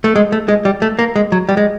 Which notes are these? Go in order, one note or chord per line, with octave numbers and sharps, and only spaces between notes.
A3
G#3
A3
G#3
G3
A3
A#3
G#3
F#3
G3
G#3